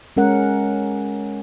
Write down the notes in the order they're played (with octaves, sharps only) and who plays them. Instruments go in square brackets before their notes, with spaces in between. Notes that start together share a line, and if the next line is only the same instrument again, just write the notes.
[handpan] G#3 C#4 A#4 F#5